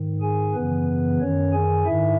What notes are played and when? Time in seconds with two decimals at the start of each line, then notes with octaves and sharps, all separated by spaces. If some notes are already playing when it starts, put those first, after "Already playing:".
Already playing: G#2 D#3
0.21 G#4 G#5
0.54 F#2 C#3 E3 B3 B4
1.20 F#2 D#3 C#4 C#5
1.53 G#4 G#5
1.85 G#2 D#3 E4 E5